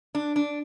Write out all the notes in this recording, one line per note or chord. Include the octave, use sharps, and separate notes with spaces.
D4
D4